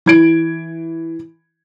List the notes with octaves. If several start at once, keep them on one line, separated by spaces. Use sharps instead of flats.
E3 G#6 D7